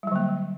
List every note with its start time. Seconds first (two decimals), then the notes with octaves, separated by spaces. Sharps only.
0.03 G3
0.07 F#3
0.11 D3
0.16 A#3